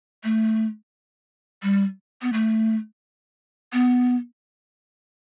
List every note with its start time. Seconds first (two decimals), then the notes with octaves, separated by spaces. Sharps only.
0.24 A3
1.63 G3
2.22 B3
2.33 A3
3.73 B3